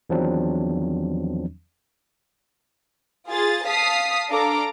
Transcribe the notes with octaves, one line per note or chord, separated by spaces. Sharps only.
E2 D#3 F3 F#3 C4 D4
F4 G#4 A6
F5 A5 D#6 B6 C7
D4 A4 F5 A#5 D6